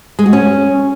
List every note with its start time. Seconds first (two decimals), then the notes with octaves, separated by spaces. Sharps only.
0.19 G#3
0.26 F#4
0.33 C#4